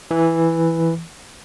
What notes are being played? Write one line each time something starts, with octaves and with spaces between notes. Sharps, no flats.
E3